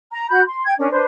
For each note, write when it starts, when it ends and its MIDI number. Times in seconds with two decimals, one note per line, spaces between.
0.11 0.27 82
0.30 0.41 66
0.30 0.41 83
0.30 0.41 91
0.47 0.63 84
0.65 0.73 79
0.65 0.73 92
0.79 0.91 61
0.79 0.91 62
0.79 0.91 70
0.91 1.06 62
0.91 1.06 71
0.91 1.06 72